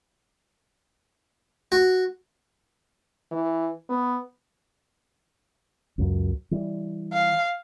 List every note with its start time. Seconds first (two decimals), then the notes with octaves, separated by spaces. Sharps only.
1.72 F#4
3.32 E3
3.89 B3
5.98 C#2 F#2
6.51 E3 G3
7.13 F5